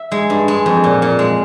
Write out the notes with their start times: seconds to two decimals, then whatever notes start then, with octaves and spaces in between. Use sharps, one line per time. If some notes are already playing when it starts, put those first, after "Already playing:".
Already playing: E5
0.12 G#3
0.30 G2
0.48 G#3
0.66 F2
0.84 A#2
1.02 A#2
1.19 G#3